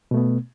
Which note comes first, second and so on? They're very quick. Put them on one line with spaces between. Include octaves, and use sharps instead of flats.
B2 A3 B3